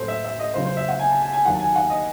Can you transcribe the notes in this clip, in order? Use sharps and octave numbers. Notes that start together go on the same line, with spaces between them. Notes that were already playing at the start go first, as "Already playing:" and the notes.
Already playing: A1 A2 F#3 A4 C5
E5
E5
D#5
C#2 C#3 F#3 C5
C5
E5
F#5
G#5
A5
G#5
G#5
D#2 D#3 F#3 F#5
A5
G#5
F#5
D#5